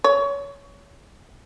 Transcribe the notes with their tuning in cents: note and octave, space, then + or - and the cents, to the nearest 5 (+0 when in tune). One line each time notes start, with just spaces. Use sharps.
C#5 +25